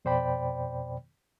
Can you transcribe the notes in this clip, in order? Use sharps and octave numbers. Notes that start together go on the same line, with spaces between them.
F2 B2 C5 D5 G5 B5